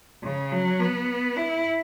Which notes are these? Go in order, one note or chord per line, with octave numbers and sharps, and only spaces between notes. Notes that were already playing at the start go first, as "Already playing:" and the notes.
C#3
F#3
B3
E4